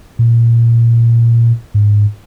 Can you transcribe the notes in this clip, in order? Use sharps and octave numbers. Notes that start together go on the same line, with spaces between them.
A#2
G#2